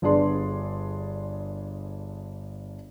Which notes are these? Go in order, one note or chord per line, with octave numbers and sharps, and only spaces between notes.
G1 D4 G#4 B4 D5 C6